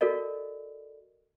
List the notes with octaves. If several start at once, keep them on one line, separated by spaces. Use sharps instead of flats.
F#4 A4 A#4 D5 D#5